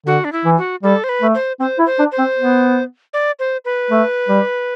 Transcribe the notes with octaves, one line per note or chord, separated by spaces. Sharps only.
D3 F#4
D4
E4
E3
F#4
G3 A4
C5
B4
A3
C5
C4 C5
E4
C5
D4
C5
C4
B3
D5
C5
B4
A3
G3